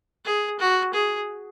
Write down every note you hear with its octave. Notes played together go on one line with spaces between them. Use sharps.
G#4
F#4
G#4